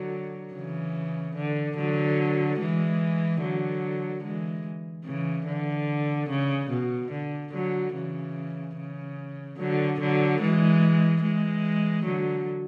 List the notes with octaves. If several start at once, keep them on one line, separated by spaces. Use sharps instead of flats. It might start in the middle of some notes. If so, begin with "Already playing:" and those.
Already playing: D3 F#3
C#3 E3
D3
D3 F#3
E3 G#3
D3 F#3
E3 G#3
C#3 E3
D3
C#3
B2
D3
D3 F#3
C#3 E3
C#3
D3 F#3
D3 F#3
E3 G#3
E3 G#3
D3 F#3